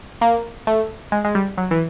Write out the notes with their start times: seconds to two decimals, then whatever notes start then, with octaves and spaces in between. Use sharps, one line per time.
0.21 A#3
0.67 A3
1.12 G#3
1.24 G#3
1.35 G3
1.58 F#3
1.71 E3